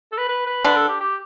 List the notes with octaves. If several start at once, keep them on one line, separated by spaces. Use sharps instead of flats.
A4
B4
B4
B4
D3 D4 B4
A4
G4
G4